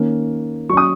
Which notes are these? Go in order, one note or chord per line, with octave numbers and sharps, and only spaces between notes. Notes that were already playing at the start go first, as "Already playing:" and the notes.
Already playing: D#3 A#3 C#4
F#3 C#4 C#6 D#6